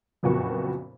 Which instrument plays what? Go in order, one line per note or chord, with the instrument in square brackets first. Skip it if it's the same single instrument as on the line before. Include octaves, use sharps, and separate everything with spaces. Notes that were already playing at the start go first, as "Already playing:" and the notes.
[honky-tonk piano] F#1 F2 A#2 B3 F#4 C#6